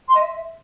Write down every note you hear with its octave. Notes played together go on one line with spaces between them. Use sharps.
C6
D#5
E5